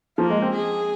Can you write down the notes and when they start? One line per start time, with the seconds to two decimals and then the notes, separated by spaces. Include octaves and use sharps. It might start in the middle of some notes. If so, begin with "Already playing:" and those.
0.18 F3 A#3
0.30 G#3
0.42 C4
0.54 G#4